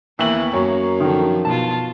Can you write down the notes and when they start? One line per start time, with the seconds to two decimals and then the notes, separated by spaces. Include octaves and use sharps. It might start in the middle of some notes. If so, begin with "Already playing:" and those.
0.19 D#2 E3 A#3 B3 F#7
0.53 F#2 A#3 C#5 A#5 C#6
1.00 D3 D#3 F3
1.45 B2 F4 A5